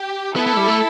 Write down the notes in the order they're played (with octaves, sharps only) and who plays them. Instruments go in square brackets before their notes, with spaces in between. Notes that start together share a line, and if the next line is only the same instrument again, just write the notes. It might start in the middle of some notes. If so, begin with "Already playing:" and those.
Already playing: [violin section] G4
[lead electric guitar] B3 [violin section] E4 A4
[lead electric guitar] B3
A3
G3
A3